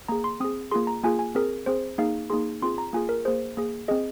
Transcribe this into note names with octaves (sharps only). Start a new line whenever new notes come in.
A#3 G#4 A#5
C6
C4 G#4 D#6
A#3 F4 G#4 C6
A#5
A#3 F4 G#4 G#5
G#5
C4 G#4 A#4
C4 G#4 C5
A#3 D#4 G#4 F5
A#3 D#4 G#4 C6
C4 F4 G#4 C6
A#5
A#3 F4 G#4 G#5
A#4
A#3 G#4 C5
A#3 G#4
C4 G#4 D#5